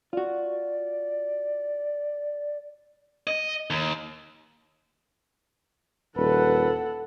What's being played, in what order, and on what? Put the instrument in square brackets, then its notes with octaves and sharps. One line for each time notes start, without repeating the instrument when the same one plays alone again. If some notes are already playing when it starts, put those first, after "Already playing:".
[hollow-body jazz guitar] F4 F#4 [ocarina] D5
[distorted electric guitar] D#5
D#2
[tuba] D#1 [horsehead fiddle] A4 F#5 [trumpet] B4